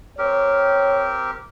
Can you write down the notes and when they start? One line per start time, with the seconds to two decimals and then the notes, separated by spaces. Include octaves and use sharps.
0.18 C4 G4 A#4 C#5